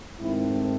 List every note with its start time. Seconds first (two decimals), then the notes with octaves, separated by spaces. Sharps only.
0.20 G#2 D#3 A3 C4 E4